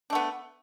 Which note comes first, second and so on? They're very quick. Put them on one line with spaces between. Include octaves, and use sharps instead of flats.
D4 A3 B3